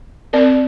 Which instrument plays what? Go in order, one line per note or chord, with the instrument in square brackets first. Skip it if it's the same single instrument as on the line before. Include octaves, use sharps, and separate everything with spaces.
[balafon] C4 A#4 D5